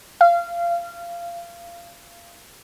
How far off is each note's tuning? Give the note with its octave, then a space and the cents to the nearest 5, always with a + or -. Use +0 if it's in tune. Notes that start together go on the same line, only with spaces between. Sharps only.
F5 -25